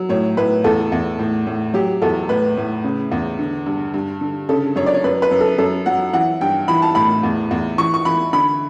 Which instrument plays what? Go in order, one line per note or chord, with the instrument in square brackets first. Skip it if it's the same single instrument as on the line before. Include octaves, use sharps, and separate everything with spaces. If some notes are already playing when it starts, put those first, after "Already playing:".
Already playing: [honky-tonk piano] F#3
A2 C#5
A2 B4
E2 A4
E2
A2
A2
F#3 G4
E2 A4
A2 B4
A2
C#3
E2
D3
G2
G2
D3
C#3 A4
F#2 C#5
D5
C#5
F#2 B4
B4
F#2
A4
F#2 A4
F#3 F#5
E3 F#5
G2 G5
E3 B5
A5
A2 B5
E2
E2
E3 C#6
C#6
E3 B5
D3 B5